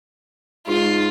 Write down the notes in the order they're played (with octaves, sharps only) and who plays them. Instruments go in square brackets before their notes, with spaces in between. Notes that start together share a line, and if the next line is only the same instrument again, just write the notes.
[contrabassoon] G#2 [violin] F4